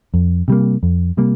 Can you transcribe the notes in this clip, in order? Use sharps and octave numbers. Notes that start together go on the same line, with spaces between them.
F2
C3 G3 A#3
F2
C3 G3 A#3